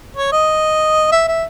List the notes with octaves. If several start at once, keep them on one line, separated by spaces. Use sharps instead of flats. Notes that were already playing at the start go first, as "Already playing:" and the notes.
C#5
D#5
E5
E5